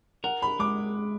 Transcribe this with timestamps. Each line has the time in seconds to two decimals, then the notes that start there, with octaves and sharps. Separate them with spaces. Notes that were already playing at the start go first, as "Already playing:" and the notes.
0.24 A#4 F#5
0.42 B5
0.59 G#3 D6